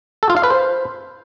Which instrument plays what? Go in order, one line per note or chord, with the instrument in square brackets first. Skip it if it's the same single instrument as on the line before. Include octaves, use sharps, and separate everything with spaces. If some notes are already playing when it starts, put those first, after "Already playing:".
[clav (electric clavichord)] A4
F4
F5
B4
C5